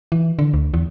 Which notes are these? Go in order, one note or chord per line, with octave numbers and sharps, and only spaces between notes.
E3
D3
D2
E2